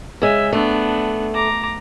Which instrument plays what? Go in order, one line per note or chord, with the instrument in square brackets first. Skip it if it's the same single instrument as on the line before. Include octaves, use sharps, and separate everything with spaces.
[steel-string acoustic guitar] C#3 G#3 [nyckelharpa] E5
[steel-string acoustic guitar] A3 [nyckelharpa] B3 D4
[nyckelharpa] A#5 D6